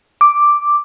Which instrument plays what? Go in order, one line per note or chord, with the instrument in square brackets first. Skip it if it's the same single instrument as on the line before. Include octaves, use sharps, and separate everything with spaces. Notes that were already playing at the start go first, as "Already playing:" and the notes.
[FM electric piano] D6